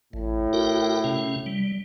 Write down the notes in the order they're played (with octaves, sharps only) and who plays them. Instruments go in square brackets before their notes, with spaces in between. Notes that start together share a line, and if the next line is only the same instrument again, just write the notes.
[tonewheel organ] A1 [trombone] A2
[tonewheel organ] F#4 A#4 G5
C3 C#4
G3